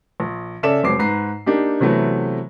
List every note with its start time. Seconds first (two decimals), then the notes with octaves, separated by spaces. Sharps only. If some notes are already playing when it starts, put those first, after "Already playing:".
0.20 A#1
0.63 C#3 A4 D5 E5 E7
0.83 F1 F#3 G#3 C4 D6 C7
0.99 G#2 B4 A#5 C7
1.46 A#3 D4 D#4 G4
1.80 C3 E3 F#3 A3 B3